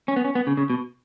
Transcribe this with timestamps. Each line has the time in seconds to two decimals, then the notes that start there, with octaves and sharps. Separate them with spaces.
0.08 C#4
0.16 B3
0.24 C#4
0.35 B3
0.47 C#3
0.57 C#3
0.70 B2